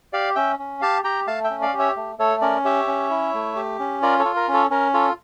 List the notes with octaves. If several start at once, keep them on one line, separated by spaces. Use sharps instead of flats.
G4 D5 F5
C#4 E5 G5
C#4
G4 F5 A5
G4 G5 A#5
A3 F5 A5
E5 G5
C#4
D5 F5
G4
C#5 E5
A3
A3 A4 C#5
C#4 A#4 D5
G4 C#5 E5
C#4
E4
A3
G4
C#4
F4 A#4 D5
A4 C#5
F4
A#4
C#4
A4 C#5
C#4 A#4
F4 A4 C#5